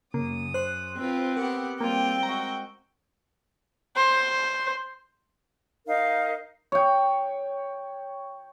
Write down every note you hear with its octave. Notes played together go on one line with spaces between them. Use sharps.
F#2 C#3 A#3 D#6
C5 C6 F#6
C4 F4 B4
B3 G4 A#4 F#5
G3 A#3 C4 F4 G5
G#3 F#4 A#5
C5
D#4 A#4 F5
C#5 G5